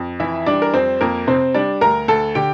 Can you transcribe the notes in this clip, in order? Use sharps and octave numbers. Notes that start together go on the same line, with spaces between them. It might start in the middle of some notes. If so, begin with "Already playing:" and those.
Already playing: F2
E3 E4 E5
G3 D4 D5
A#4
F2 C4 C5
F2 A#3 A#4
C3 C4 C5
G3 D4 D5
D2 A#4 A#5
D2 A4 A5
D3 G4 G5